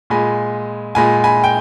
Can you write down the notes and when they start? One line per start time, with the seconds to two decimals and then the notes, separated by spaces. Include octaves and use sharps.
0.10 A#2 G#3 G#5 B5
0.95 A#2 G#3 G#5 B5
1.24 G#5 B5
1.44 G5